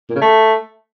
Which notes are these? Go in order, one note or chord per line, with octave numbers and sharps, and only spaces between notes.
A#2
C#3
A3